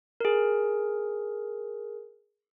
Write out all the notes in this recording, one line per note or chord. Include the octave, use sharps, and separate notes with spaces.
G#4 A#4